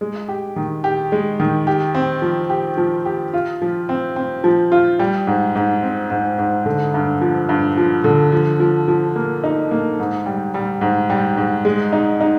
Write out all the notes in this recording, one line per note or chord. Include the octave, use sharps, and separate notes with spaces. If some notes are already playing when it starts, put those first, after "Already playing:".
G#3
G4
D#3
G4
G#3
D#3
G4
C4
F3
G4
F3
G4
F4
F3
C4
C4
F3
F4
G3
G#2
G#2
C4
G#2
G#2
D3
G2
F3
G2
F3
D3
F3
F3
F3
A#3
D#4
A#3
G#2
G3
G3
G#2
G3
G#2
G#3
D#4
D#4